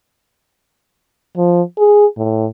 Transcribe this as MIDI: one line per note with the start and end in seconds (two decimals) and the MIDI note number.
1.37 1.62 53
1.78 2.06 68
2.17 2.46 45